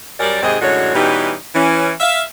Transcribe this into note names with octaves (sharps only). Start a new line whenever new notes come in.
F#2 G3 C#4 A#4 D5
D#2 G#2 C3 C4 G#4 D#5
F#2 A2 D3 G#3 F#4 C#5
B2 E3 G3 C#4 D#4 G4
E3 C#4
E5 F5